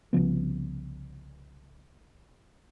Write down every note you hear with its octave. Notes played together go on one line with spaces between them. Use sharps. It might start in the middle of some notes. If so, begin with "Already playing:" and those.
C2 C#3 F3 B3